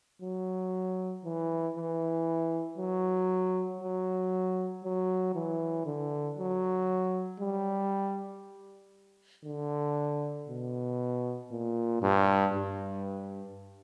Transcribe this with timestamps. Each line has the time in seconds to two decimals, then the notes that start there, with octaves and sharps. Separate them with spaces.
0.22 F#3
1.25 E3
1.76 E3
2.78 F#3
3.81 F#3
4.84 F#3
5.35 E3
5.86 D3
6.38 F#3
7.41 G3
9.45 D3
10.49 B2
11.51 A#2
12.02 G2
12.54 G2